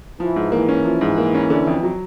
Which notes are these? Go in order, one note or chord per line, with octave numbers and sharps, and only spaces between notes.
E3 F3
G#2
E3 A#3
C#4
F3
G#2
A#3
C#4
D3
F2
F#3